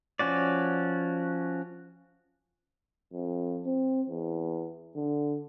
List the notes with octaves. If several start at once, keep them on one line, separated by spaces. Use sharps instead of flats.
F3 C#4 F#4 D5
F2
C4
E2
D3